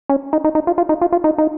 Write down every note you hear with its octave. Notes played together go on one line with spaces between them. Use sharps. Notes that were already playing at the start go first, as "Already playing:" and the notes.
C#4
D#4
D#4
D#4
F4
F4
D#4
F4
F4
D#4
D#4